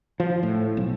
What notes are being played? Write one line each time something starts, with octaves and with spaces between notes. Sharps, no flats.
F3
A2
B1